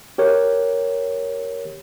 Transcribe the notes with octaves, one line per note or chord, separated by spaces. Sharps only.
G4 A#4 C#5